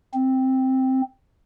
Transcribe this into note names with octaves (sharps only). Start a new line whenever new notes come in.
C4